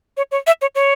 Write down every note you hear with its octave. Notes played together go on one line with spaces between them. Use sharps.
C#5
C#5
E5
C#5
C#5